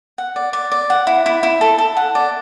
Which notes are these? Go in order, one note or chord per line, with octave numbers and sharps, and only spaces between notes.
F#5
D5
D5
D5
F#5
E4
E4
E4
A4
A4
F#5
D5